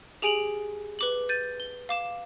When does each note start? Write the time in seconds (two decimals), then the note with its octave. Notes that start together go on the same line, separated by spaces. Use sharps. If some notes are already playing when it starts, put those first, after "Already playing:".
0.22 G4 G#4 G#5 D7 F7 F#7
0.99 B4 D6 F#7
1.29 G6 A6 D#7
1.60 G7
1.89 F5 D6 E7